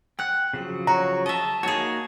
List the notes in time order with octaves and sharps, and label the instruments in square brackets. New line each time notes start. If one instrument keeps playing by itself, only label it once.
[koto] F#5 [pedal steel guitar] G5 F#6
[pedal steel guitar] C#3 F3 F#3
[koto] F#4 [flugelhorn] C#5 [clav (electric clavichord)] A#5
[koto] D#5 E5 [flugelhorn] A5
[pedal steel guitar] A#3 D#4 F#4 [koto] G#4 C#5